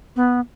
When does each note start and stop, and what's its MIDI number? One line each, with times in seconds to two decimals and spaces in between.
0.16 0.40 59